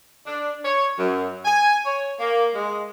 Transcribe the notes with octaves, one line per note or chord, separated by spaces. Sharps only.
D4
C#5
F#2
G#5
C#5
A#3
G#3